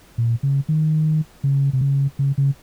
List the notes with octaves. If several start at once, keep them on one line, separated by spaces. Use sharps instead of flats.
A#2
C#3
D#3
C#3
C3
C#3
C#3
C#3